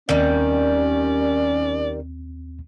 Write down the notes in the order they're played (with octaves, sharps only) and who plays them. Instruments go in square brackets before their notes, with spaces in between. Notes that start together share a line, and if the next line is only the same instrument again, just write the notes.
[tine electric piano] D#2 C4 [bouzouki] D#3 G3 [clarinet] C#4 [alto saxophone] D5